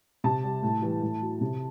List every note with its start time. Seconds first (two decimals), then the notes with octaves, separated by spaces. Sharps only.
0.24 C3 A5
0.44 G3
0.63 A2
0.82 E3 G3
1.02 A2
1.22 F#3
1.41 C3